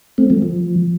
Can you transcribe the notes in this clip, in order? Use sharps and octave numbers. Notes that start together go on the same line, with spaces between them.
A3 C4
F3 A3
F3